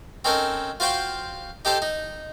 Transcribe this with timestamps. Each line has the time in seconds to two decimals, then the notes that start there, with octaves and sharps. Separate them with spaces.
0.25 C4 C#4 D#4 A4 A#4
0.80 F4 F#4 C5 F5 G5
1.65 D#4 G4 A4 C5
1.82 D#4